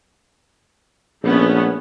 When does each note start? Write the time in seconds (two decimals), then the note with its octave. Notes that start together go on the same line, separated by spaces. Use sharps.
1.24 A#1 A3 B3 C#4